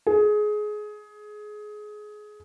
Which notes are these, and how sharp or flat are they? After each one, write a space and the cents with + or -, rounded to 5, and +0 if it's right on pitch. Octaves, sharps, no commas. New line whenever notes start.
G#4 +20